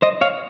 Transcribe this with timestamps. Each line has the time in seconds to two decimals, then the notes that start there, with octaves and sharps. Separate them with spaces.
0.02 C5 D#5
0.21 C#5 F5